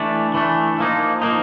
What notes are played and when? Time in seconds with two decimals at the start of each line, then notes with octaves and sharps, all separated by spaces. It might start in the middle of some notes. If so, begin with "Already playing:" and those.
Already playing: E3 A3 D4
0.34 E3 A3 D4
0.79 F3 A#3 D#4
1.22 F3 A#3 D#4